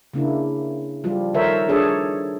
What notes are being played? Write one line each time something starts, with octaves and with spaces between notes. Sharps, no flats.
C#3 A#3 D4 E4
F3 G3 F4
D#3 A4 A#4 C5 C#5 E5
D4 G#4 A4 C#5